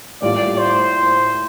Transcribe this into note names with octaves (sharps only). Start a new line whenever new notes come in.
A2 G3 A#3 F4 D5
C5